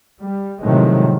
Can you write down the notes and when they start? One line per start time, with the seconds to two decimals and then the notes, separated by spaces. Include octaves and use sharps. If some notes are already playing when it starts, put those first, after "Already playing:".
0.20 G3
0.61 A2 C3 D#3 F3 F#3 G#3